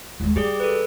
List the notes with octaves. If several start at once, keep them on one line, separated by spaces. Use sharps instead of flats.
D#2 G#3
G3 G4 G#4 D5
A4 B4